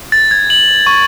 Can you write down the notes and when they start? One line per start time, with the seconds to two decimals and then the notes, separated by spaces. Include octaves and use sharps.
0.12 A6
0.31 G#6
0.50 F#7
0.87 C#6